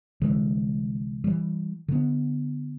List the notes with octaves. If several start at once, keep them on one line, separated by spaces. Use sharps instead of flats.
C2 D3 E3 G#3
E3 G3
D3 B3